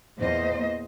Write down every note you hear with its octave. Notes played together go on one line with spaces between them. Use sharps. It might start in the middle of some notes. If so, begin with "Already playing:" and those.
E2 A#2 C5 D#5